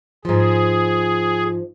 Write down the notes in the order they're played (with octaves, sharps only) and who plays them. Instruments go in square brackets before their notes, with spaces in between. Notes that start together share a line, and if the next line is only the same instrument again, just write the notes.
[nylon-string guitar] G#2 F3 [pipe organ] G#4